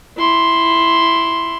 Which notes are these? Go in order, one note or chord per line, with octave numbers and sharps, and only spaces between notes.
E4 C6